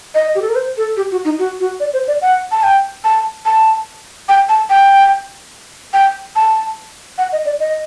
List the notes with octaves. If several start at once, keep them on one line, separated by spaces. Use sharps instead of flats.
D#5
G4
A4
A#4
C5
A4
G4
F#4
D#4
F#4
F#4
D5
C5
D5
F#5
A5
G5
A5
A5
G5
A5
G5
G5
A5
F#5
D#5
D5
D#5